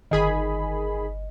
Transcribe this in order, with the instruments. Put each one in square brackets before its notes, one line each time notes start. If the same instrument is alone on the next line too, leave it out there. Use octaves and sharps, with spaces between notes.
[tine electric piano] G1 D#5 [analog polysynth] D#3 G#4 B5